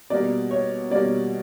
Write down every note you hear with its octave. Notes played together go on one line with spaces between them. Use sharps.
B2 G3 A#3 D5
C#5
B2 G3 A#3 D5